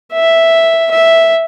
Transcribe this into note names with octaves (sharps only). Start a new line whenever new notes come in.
E5
E5